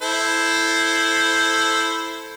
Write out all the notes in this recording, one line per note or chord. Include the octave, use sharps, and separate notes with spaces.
E4 A4 C5